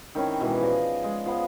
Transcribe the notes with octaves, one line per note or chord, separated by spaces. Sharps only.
D#3 C4 C#4 E4
B2 E3 G#3
F3 G#4 D5 D#5
G#3
F3 B3